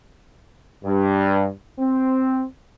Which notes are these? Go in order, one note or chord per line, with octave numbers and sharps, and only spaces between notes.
G2
C4